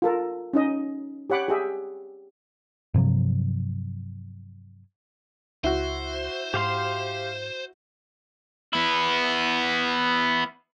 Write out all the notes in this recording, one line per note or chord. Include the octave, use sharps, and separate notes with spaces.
F4 A4 A#4
C#4 D#4 D#5
G4 C#5 F#5 B5 D6
G4 G#4 E5
G2 C3 F3 F#3
C#2 E4 F#4 C5
G#2 G4 F5 C6
B3 E4